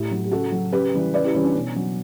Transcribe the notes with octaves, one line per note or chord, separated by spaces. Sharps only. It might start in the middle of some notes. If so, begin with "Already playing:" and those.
Already playing: A2 E4 G4
F#3
G4
C#3 F#4 A4
F#3
C#3 G4 B4
E3 G3
C#3 B4 D5
E4 G4
E3 G3 C#4 E4
D4
B2 C#4
F#3